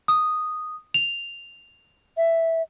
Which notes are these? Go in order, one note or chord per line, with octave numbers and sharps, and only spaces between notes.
D#6
F7
E5